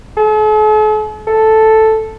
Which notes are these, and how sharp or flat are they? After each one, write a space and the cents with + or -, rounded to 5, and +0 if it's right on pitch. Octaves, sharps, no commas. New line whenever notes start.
A4 -45
A4 +0